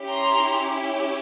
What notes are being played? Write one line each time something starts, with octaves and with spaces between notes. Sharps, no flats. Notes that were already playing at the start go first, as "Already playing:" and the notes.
Already playing: C#4 E4 G4
A#5 C6